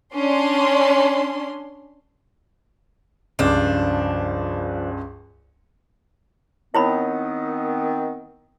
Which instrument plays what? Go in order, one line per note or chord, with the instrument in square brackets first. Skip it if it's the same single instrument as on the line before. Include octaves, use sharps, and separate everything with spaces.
[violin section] C#4 D4 C6
[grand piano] C#2 G2 [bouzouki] F3 D4
[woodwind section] D#3 B3 C4 [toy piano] E4 C#5 B5